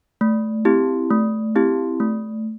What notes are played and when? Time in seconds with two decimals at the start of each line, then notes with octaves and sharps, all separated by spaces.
0.21 A3
0.65 C4 E4 G4
1.11 A3
1.56 C4 E4 G4
2.00 A3